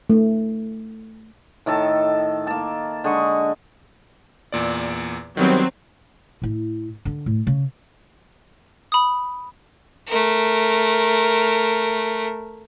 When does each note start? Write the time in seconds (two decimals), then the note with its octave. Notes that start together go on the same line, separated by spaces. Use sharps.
0.10 A3
1.66 A2 D#3 A4 A5
2.47 A#3 A5
3.04 D3 G#3 D#5 C#6
4.52 E2 A#2 D5
5.37 D#3 F#3 G3 B3 C4
6.42 A2 E4
7.05 D3 D4
7.26 A2
7.47 C#3
8.92 B5 D#6
10.07 A3 A#4